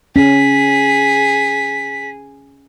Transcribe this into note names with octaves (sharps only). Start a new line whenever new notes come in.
C#4 G#4 B6